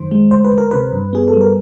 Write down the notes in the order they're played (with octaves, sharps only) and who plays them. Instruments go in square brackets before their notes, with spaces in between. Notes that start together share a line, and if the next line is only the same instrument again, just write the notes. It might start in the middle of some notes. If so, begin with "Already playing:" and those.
Already playing: [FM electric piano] F#2 D#3 C5
G#3
D2 C5
B4
D2
A#4
C3 B4
G2
B3 G#4
A4
G3
A#4